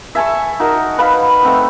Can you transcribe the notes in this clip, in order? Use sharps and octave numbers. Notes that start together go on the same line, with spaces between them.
E5 G#5 A5 C#6
D#4 F#4 A#4
B4 F5 B5
A3 C4 F#5